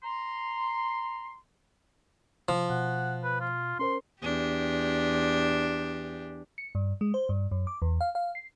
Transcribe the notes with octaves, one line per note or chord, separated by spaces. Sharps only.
A#5 C6
C3 F3
B2 F#5
B4
F4
C#4 A#4 C5 C6
E2 D4 G4
C#7
G2
G#3
C5
G2
F#2
D6
E2
F5
F5
C7